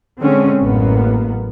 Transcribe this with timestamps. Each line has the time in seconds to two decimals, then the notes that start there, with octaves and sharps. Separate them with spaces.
0.20 D3 G#3 C4 C#4
0.60 A1 F#2 A#3 B3